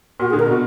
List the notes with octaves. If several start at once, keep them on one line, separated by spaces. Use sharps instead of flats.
A#2 F#4
G#4
D3
A#4
B2
F#4